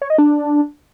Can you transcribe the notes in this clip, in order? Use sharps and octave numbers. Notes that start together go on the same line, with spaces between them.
C#5
D#5
D4